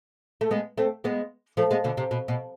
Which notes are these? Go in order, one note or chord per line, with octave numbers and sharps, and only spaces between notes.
A3
G#3 B3
A3 C4
G#3 B3
F3 A3
G#3 B3
B2 D3
C3
B2
B2